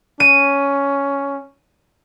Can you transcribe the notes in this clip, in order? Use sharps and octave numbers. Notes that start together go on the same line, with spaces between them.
C#4 D#7